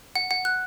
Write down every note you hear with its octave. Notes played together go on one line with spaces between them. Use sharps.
F#5
F#5
F#6